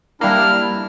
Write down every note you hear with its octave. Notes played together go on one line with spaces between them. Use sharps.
G3 A#3 D4 E4 F6
F2